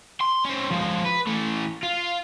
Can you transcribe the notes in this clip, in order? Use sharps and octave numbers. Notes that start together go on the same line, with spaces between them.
C6
C4 C#4
F3 G#3
B4
E3 A3
F4